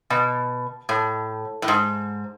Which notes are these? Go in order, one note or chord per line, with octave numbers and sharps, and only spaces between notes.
B2
A2
A2
G#2